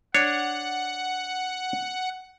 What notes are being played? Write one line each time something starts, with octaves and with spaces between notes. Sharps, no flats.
D4 C#5 F#5